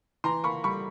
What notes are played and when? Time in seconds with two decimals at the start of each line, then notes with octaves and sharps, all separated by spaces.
0.24 E3 A#5 C6
0.44 A#3 B5 C#6
0.64 G3 B5 C#6